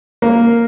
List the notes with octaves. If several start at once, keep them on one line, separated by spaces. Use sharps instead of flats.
A#3